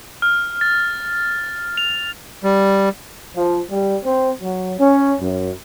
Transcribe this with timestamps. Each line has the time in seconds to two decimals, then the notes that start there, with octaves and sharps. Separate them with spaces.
0.22 F6
0.61 A6
1.77 F7
2.43 G3
3.36 F3
3.70 G3
4.04 C4
4.41 F#3
4.78 C#4
5.20 F#2